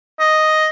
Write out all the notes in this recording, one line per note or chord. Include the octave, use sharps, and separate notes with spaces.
D#5